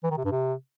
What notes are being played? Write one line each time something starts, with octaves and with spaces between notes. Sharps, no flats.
E3
D#3
C3
G2
C3